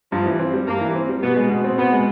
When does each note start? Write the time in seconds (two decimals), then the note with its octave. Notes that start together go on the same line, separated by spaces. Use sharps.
0.12 G2 F3
0.26 E3
0.39 C4
0.54 G3
0.67 G2 A#3
0.81 E3
0.95 C4
1.09 G3
1.23 B2 B3
1.36 G#3
1.50 B2
1.64 C4
1.78 B2 B3
1.93 G#3